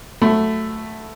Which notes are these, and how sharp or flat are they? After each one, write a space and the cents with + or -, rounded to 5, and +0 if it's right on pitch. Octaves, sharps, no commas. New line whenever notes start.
F#3 +0 A3 +0 B5 +35